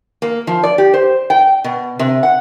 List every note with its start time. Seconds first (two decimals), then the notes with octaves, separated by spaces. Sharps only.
0.22 A#3
0.47 F3
0.63 D5
0.78 G4
0.94 C5
1.30 G5
1.64 B2
1.99 C3
2.23 F#5